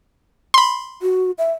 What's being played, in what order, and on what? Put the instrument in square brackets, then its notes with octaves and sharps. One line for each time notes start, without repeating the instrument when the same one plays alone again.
[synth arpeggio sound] B5 C6
[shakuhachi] F#4
E5